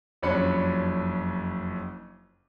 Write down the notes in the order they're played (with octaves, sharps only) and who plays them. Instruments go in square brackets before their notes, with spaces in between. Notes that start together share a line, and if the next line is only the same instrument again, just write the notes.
[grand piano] F#1 F2 C#4 D4 B5 C#7